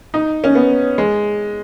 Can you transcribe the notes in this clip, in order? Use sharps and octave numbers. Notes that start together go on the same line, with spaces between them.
D#4
C#4
B3
G#3